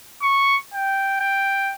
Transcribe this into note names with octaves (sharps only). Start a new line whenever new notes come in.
C#6
G5
G5